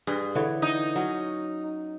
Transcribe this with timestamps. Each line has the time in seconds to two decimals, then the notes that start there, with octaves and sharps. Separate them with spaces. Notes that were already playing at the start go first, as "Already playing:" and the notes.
0.07 G2 G#4
0.35 D3 E3 C#5
0.62 D#4
0.96 F#3 C#4